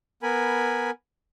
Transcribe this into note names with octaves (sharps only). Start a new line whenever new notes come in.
B3 A#4 G#5 B5